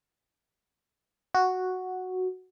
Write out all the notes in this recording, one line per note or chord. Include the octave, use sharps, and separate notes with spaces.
F#4